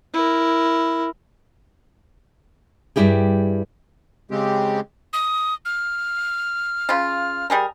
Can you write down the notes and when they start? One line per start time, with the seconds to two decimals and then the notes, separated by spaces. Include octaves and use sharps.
0.14 E4 A#4
2.96 G2 C3 G3 E4 G4 G#4
4.31 C#3 G#3 C4 G4
5.13 D#6
5.65 F6
6.89 C#3 F4
7.50 G3 G#4 A#4